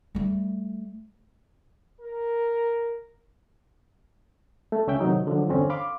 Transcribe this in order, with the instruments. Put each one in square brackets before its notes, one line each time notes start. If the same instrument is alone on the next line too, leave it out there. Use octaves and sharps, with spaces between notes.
[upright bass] G3 A3
[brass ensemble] A#4
[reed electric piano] A3
C#2 C#4 E5 G5
A2 C3 D#3 F#3 D#4
D3 F3 F#3
E2 G2 D3 C4 C#4
F5 B5 C6 D6